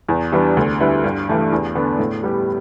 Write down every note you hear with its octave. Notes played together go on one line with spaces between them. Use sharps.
E2
E3 G3 B3 D4
D2
D3 G3 E4 B4
G2
E3 A3 D4
E2
D3 B3 D4
A2
G3 B3 G4